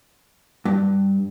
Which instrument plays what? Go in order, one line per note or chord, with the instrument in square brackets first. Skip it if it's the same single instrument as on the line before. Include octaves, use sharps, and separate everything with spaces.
[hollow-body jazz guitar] G2